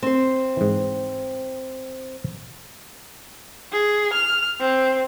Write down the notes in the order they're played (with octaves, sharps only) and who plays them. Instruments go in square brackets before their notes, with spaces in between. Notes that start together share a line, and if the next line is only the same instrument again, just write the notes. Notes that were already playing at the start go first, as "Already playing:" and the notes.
[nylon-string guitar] C4 C5
[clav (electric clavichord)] G#2 E3
[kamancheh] G#4
F6
C4